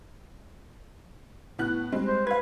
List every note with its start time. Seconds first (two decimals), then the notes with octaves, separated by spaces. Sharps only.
1.59 A2 B3 F#6
1.92 G3 G#3 C4
2.07 C5
2.27 B4 F5 G#6